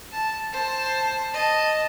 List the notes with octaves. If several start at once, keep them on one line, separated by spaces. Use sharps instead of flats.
A5
C5 A5
D#5 A5